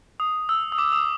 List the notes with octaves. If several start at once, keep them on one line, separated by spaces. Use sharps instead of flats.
D#6
E6
D#6
D6
D#6